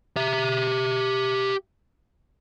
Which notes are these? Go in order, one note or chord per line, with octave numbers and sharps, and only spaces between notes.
G4 E5